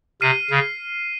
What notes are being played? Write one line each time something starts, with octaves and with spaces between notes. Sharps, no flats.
C3 F6 C7 D#7
C#3